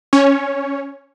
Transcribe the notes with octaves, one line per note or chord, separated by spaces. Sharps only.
C#4 C#5